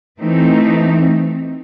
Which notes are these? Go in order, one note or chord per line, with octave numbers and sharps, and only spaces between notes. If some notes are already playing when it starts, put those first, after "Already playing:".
E3 A3 C4 D#4